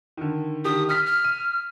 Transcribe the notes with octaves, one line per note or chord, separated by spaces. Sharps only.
D3 D#3
D3 D#3 G4 D#6
D#6 F6 B6
F6
D#7